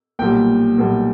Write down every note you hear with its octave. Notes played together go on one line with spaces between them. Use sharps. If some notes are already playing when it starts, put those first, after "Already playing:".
B1 A#2 G3 G5
B1 A#2 G3